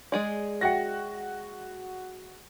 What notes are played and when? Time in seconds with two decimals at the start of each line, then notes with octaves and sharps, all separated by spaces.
0.12 G#3 G#4 D5
0.61 F#4 D#5 E5 F#5 G5 A#6